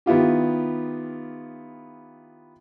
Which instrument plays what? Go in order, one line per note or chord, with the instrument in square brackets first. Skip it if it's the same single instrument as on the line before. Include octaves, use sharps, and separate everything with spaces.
[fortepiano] D#3 B3 E4 F4 G4